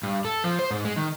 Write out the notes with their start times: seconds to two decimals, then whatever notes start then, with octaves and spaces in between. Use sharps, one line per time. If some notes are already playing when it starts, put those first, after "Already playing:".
0.03 G2
0.25 A4
0.44 F3
0.59 C5
0.71 G#2
0.85 G#3
0.96 D#3